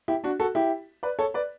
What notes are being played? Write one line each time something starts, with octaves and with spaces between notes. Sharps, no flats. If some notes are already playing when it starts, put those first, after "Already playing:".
E4 G4
D4 F#4
F#4 A4
E4 G4
B4 D5
A4 C#5
B4 D5